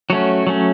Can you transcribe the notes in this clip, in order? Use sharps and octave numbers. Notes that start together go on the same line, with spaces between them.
F#3 A3 C#4 F#4
F#3 A3 C#4